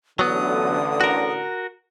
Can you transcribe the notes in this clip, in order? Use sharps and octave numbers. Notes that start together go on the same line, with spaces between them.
A1 D3 F#3 B3 D#6
F#4 A#4